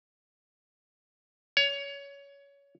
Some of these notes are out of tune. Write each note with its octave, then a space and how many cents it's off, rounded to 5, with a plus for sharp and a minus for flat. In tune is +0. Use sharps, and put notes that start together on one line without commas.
C#5 +20